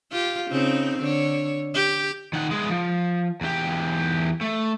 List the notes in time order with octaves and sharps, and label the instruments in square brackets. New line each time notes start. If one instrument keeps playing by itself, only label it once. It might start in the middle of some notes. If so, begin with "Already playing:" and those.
[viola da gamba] F4 G4
C#3 C4 D#4
D3 C#5
G4
[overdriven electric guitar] D#3 F#5
G#3 B3
F3
E2 G4
A3